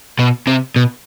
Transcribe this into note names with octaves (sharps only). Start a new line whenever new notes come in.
B2
C3
B2